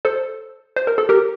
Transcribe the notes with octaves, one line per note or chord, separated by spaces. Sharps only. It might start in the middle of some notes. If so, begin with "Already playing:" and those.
A4 C5
C5
A#4
A4
G4 A#4